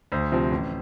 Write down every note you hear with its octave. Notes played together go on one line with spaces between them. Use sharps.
D2 C5
C3 F3 C4
A1